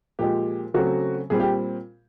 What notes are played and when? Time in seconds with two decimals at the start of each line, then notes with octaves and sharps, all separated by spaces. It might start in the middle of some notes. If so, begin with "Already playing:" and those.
0.19 A#2 F3 G#3 G4
0.74 C#3 F#3 A3 C4 F#4
1.30 A#2 G3 C4 G#4
1.40 G4